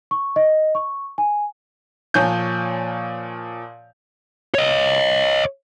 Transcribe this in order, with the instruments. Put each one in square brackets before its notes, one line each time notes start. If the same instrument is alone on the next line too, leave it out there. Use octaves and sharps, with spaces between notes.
[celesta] C#6
D#5
C#6
G#5
[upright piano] A#2 F3 C#5 G#5 G6
[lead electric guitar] C#5 D#5